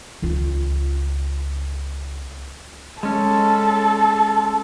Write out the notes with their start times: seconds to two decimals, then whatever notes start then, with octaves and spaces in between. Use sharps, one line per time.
0.22 C#2 F4
3.03 G#3 C#4 A4